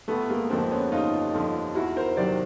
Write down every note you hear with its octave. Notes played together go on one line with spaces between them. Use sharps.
G1 A3 B3
G#3 A#3
F2 D3 F3 A#3 C4
B3 C#4
G1 D#4 F4
F2 D3 F3
E2 E4 F#4
A#4 C5
C3 D#3 F#3 C5 D5